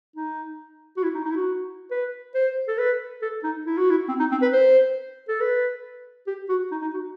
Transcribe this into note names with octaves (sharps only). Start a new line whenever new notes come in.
D#4
F#4
E4
D#4
D#4
E4
F#4
B4
C5
A4
B4
A4
D#4
E4
F#4
E4
C4
D#4
C4
B4
C5
A4
B4
G4
F#4
D#4
D#4
F#4